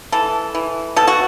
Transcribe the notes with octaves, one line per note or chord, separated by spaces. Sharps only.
E3 A4
E3
B2 A4
F#4